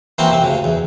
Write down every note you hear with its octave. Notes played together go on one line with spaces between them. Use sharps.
E3 A#3 C4 C#4 F#4 C5
C3 C4
D2 C#3
E2